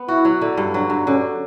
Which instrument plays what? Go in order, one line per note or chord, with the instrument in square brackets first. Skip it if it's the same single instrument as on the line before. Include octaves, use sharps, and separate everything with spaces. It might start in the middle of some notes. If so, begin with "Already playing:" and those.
Already playing: [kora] B3
[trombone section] E4 [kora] F#4
[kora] F#3
D3
G2
[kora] F#3 [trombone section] D4
[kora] G2
[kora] D3 [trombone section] C#4